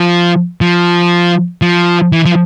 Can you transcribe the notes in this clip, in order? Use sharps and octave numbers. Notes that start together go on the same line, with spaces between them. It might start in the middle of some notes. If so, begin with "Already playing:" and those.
Already playing: F3
F3
F3
E3
F3